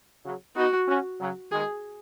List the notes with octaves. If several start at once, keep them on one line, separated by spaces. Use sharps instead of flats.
C#3 F#3
B3 D#4 F#4
C#4 F#4
C#3 F#3
D#3 G#3 G#4